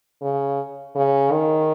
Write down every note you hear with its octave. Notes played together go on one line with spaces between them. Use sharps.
C#3
C#3
D#3